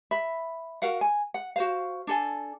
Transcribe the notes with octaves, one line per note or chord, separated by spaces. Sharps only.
E5 B5
F#4 A#4 F5 F#5
G#5
F#5
F#4 C5 F5
D4 A4 G#5